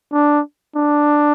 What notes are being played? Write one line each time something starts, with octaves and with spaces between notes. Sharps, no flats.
D4
D4